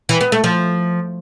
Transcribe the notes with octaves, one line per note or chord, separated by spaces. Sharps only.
E3
B3
A3
F3